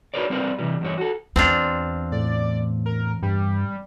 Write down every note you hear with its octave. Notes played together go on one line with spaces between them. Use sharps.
D4 F#4 A#4 B4 C#5 D5
G3 C4 A#4 B4 D5 F5
C3 E3 G3
E2 G2 C#5
F#4 A4
E2 C4 D4 F4
A2 D5
A#4
G2 G3